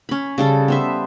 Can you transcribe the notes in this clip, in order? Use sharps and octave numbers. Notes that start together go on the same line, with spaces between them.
C#4 B5
C#3 G3 A4
B3 C5 E5